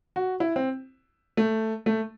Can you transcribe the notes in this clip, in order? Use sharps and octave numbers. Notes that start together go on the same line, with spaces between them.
F#4
E4
C4
A3
A3